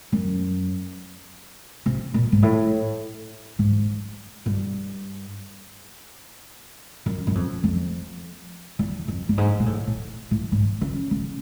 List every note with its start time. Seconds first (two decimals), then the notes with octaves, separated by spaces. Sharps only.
0.12 F#2
1.86 C3
2.14 A#2
2.32 G#2
2.43 A2
3.59 G#2
4.46 G2
7.06 F#2
7.27 F#2
7.35 F2
7.63 F2
8.79 E2
9.08 F2
9.29 G2
9.38 G#2
9.60 A#2
9.66 A2
9.87 A2
10.31 A2
10.52 G#2
10.81 C#3
11.11 C#3